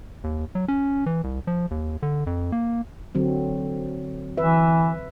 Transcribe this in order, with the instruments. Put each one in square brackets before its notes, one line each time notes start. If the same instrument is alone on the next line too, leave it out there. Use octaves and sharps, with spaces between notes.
[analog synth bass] D#2
F#3
C#4
E3
C2
F3
D#2
D3
F2
A#3
[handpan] D3 F#3 C4
[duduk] E3 [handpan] B4 E5